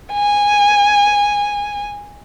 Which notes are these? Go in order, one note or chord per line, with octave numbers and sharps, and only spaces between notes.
G#5